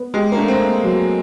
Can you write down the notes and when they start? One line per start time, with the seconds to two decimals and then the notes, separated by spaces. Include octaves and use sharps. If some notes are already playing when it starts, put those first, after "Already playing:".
Already playing: B3
0.14 G#3 G4
0.32 A#3
0.37 A3 D4
0.48 C4
0.60 A#3
0.83 F#3